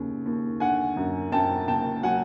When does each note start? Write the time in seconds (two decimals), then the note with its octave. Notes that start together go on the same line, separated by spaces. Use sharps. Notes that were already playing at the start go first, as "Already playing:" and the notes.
Already playing: D#2 C#3
0.26 D#2
0.60 D3 F#5 G#5
0.96 F#2
1.32 F#2 G5 A5
1.68 F#1 G5 A5
2.03 F#3 F#5 G#5